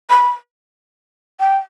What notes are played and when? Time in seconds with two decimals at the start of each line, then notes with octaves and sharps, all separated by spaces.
0.10 B5
1.40 G5